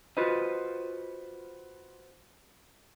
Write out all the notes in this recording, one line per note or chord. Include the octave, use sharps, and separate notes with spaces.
F4 F#4 B4 C5 D#5